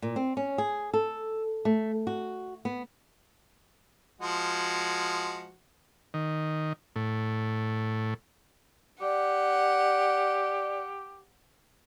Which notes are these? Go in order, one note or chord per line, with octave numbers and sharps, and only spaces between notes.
A#2
C4
C#4
G#4
A4
A3
F#4
B3
F3 G#3 F#4
D#3
A2
G4 D5 F#5